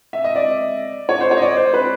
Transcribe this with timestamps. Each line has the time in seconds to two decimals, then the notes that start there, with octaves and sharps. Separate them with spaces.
0.13 E5
0.24 D#5
0.35 D5
1.09 C#5
1.21 C5
1.31 C#5
1.37 D#5
1.42 D5
1.57 C5
1.74 B4